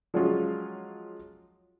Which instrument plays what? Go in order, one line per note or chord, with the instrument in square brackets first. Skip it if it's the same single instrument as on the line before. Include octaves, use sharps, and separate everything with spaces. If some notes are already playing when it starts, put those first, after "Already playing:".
[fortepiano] F3 F#3 G#3 C#4 F4